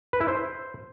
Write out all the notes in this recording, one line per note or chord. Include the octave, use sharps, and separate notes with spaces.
B4
E4
C5